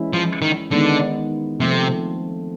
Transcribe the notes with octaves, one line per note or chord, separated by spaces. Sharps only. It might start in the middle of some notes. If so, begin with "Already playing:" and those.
Already playing: E3 G#3 C#4 E4
F3
D#3
D3 D#3 G#3 B3 D#4
C3 F3 A3 C4